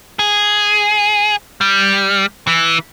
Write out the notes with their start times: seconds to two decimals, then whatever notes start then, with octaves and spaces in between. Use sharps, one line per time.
0.19 G#4
1.61 G3
2.47 E3